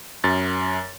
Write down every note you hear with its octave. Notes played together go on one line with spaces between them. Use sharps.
F#2 A6